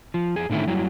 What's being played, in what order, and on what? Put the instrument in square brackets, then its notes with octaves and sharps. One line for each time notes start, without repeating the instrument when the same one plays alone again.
[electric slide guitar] F3
F2 G#4
A2 D3 D#3 A3 E4
F#2 F#3 G3 E4